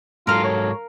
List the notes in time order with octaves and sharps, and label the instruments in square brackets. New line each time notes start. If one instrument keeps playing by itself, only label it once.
[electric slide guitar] G#2 F#3 A4 [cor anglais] F4 [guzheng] A#4 F5
[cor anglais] C#5